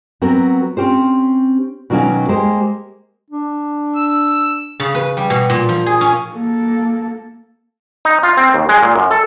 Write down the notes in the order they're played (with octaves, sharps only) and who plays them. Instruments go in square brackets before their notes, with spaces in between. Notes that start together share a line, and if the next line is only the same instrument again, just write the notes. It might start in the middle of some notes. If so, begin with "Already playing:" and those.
[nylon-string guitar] F#3 B3 C4 A#4
C4 C#4 G4 C5
B2 D#3 F#3 A#3 C#4
G#3 A#3 G4 C5
[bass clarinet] D4
[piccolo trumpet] E6
[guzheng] C#3
B4
G3
B2
A#2
F3
G#4
C#4
[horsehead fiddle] A#3 A4
[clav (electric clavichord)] D#4
F4
C4
D#2
G#3
A#2
F#2
A4